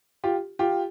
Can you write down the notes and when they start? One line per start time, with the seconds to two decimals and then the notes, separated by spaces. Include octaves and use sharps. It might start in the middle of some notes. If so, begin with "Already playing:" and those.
0.24 F4 G4
0.59 F4 G4